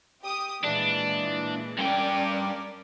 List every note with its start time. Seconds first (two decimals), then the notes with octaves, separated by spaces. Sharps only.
0.22 G4 D#6
0.64 A#2 E3 G#3 D4
1.79 G2 C#4 A#4 D5 G5